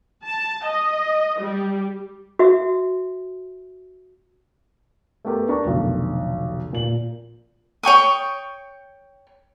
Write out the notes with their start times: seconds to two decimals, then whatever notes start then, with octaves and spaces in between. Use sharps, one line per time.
0.24 A5
0.66 D#5
1.40 G3
2.39 F#4 E5
5.25 A3 B3 G4 A#4
5.49 D4 A#4 A5 A#5 C#6
5.65 F1 B1 D3
6.73 A#2 F#7
7.83 C#5 G5 C#6 D#6